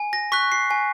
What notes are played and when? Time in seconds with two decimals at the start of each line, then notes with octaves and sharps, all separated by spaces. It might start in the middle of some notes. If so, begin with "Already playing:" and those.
Already playing: G#5
0.13 A#6
0.32 C#6 F#6 B6
0.52 C7
0.71 G#5